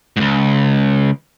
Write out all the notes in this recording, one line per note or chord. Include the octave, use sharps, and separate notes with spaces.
C#2 G#2